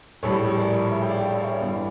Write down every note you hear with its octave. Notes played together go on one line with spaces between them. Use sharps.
A#1 A2 G3 A4 C#5
A#4 D5
C#5 E5
G5
D5 F5
D5 F5
D5
C#5 E5
G1 G2 E3 D5 F5